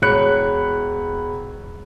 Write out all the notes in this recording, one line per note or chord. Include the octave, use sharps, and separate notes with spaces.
E1 C#5 B5 F#6 C#7